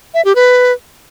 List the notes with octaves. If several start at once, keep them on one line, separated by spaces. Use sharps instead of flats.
E5
G4
B4